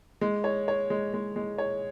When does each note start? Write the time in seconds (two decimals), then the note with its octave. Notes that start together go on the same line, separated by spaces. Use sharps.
0.21 G#3
0.44 C#5
0.68 C#5
0.90 G#3
1.13 G#3
1.36 G#3
1.58 C#5